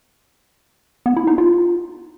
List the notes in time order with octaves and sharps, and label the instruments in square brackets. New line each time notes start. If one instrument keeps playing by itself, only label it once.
[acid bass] B3
E4
D#4
F4